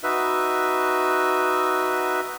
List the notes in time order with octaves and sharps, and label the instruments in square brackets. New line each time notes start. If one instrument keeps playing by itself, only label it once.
[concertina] D#4 F#4 B4 E5